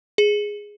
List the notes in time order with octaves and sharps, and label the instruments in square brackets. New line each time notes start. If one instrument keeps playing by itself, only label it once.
[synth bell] G#4